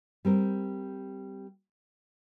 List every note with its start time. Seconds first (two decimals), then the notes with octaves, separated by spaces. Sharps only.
0.25 G3 C4 A#4